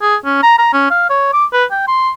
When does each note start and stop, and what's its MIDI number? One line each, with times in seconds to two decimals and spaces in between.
0.02 0.16 68
0.25 0.39 61
0.43 0.56 82
0.58 0.69 82
0.73 0.89 61
0.91 1.05 77
1.10 1.32 73
1.33 1.45 86
1.53 1.65 71
1.71 1.85 79
1.88 2.10 84